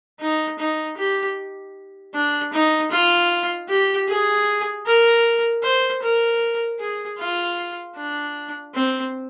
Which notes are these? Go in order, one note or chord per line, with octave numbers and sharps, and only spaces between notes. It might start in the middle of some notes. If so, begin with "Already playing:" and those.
D#4
D#4
G4
D4
D#4
F4
G4
G#4
A#4
C5
A#4
G#4
F4
D4
C4